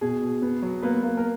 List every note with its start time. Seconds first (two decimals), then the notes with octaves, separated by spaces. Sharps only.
0.01 B2 G#4
0.22 B2
0.42 B3
0.62 F#3
0.83 A#3 B3 B4
1.03 A#3
1.17 A#4